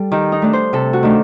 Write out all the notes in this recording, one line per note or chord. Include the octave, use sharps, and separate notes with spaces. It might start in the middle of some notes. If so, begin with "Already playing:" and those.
Already playing: G3 A4
D#3 G4
D#4
A3 D4
C5
C3 A4
F#4
D#3 A3 D4